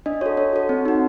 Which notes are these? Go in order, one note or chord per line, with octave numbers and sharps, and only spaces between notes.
D4 D#5
F#4 A4 C#5
D4 C#5
F#4 A4
C4
D#4 F#4